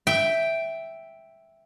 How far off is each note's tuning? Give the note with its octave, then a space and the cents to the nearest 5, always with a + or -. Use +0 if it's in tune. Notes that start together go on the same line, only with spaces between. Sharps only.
E5 +0 G5 +0